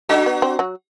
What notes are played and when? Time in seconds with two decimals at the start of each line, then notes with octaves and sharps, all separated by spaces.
0.09 A3 D4 F#4
0.26 B3
0.42 C4
0.59 F#3 F#4